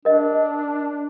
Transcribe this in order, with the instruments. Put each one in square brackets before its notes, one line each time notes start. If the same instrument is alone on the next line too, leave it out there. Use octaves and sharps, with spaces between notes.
[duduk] D4 [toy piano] A#4 D#5